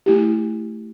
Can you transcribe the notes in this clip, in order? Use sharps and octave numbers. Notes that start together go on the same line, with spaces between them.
A3 E4 G4